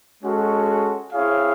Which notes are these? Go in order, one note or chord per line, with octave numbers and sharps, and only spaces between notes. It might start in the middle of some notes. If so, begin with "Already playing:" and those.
G#3 C#4 F#4 A4
C4 E4 G#4 C#5 F5